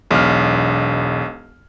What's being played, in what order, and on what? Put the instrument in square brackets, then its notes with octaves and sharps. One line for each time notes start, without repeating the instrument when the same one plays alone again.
[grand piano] E1 F6 [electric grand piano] B1